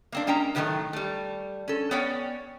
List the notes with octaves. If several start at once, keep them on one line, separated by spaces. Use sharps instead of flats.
A#3 C4 D4
G#3 A#3 C#4 G5 A#5
A2 C3 D#3 E3 F#3 A3
G3 A3
C#4 A4
B3 C#4 C#5 D5 G5